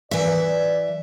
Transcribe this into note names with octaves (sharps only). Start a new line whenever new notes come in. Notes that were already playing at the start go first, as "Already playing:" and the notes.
E3 D5 E5